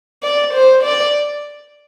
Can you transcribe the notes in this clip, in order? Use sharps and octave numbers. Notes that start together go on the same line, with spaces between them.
D5
C5
D5